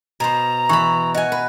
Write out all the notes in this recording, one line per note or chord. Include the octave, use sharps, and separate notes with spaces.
B2 C5 A#5
E3 B5 C#6
F#4 D#5 G#5
B4